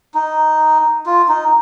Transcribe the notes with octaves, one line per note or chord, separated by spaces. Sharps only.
D#4
F4
D#4